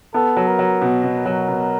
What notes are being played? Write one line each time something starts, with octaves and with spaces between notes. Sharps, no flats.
B3 A4
F#3
A#4
F#3
B2
B2
A#4
F#3
B2